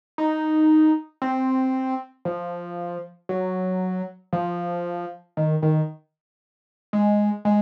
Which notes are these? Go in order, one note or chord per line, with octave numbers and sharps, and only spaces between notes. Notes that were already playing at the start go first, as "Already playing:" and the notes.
D#4
C4
F3
F#3
F3
D#3
D#3
G#3
G#3